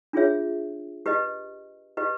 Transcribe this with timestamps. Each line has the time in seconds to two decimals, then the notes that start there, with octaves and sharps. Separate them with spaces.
0.13 D4 F4 G#4 C#5 E5
1.06 G4 B4 D#5
1.97 G4 B4 D#5